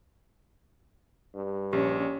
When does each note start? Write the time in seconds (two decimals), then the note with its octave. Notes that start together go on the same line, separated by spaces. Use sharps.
1.35 G2
1.73 A#1 C#4 G4